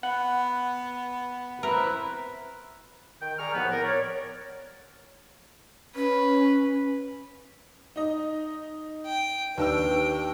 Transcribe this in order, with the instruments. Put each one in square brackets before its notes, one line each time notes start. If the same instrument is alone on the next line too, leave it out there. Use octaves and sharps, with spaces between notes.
[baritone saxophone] B3 [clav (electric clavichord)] F#5
[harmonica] C4 B4 E5 [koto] A#4
[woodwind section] D#3 G5
G#4 D5 A#5 C#6 F6
D#2 A2 F3 B3
A#4
C#5 D5
[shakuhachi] C#4 [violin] B4
[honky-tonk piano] D#4 D#5
[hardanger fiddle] G5
[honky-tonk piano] D#2 D4 E6 [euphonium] B4 [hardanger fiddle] G5